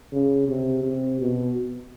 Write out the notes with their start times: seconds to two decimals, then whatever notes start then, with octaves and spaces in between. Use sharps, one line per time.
0.12 C#3
0.48 C3
0.83 C3
1.20 B2